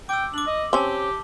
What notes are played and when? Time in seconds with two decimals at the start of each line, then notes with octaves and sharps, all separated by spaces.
0.09 G5 D6 E6
0.34 D4 D6 F#7
0.47 D#5
0.73 C4 C#4 G4 A5 G7